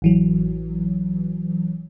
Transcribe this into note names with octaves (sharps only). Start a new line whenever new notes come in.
A1 E3 F#3